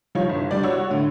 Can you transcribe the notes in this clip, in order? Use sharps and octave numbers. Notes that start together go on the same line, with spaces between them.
F3 G3 D#4 C#5 F5
G1
G3 D4 D5
F#4 C#5 E6
A2 D3